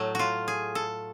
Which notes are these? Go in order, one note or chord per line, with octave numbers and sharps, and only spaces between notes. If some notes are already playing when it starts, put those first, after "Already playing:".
Already playing: A2 F#3 A3
F4 F#4
G#4
A4